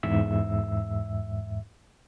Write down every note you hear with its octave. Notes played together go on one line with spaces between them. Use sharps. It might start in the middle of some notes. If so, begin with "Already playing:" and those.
E2 G#2 E5 E6